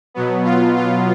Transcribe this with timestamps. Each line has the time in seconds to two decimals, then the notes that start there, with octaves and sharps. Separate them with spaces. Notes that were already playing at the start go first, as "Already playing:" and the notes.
0.14 B2 F#3 B3
0.44 F4
0.76 F4